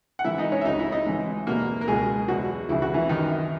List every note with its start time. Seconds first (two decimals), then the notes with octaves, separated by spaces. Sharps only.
0.19 F#5
0.24 G#2 E3 E4 E5
0.38 D#4 D#5
0.52 C#4 C#5
0.61 E5
0.65 C#2 C#3 F#3 D#4 D#5
0.79 E4 E5
0.92 D#4 D#5
1.07 G#2 E3
1.47 E2 B2 F#3 A#3 A#4
1.81 A#4
1.88 C#2 B2 F#3 G#3 G#4
2.28 E2 B2 F#3 F#4
2.69 C#2 C#3 E3 E4
2.82 F#4
2.94 E3 E4
3.09 F#2 D#3 E3 D#4